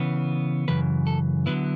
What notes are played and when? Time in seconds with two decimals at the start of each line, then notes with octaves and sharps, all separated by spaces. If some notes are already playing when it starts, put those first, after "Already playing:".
Already playing: C#3 E3 B3
0.68 F#2 C#3 E3 B4
1.07 A4
1.46 D3 F#3 B3 E4 B4